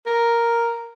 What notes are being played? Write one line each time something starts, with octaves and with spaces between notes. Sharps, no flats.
A#4